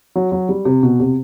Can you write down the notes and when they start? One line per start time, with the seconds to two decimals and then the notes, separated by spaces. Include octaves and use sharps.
0.16 F#3
0.32 F#3
0.49 G3
0.65 C3
0.83 B2
1.00 C3